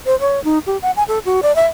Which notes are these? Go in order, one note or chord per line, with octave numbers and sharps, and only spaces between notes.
C5
C#5
D#4
G4
F#5
G#5
A4
F#4
D5
E5